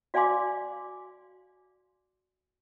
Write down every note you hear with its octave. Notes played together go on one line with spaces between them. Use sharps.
F#4 D5 F5 G#5 C6 D6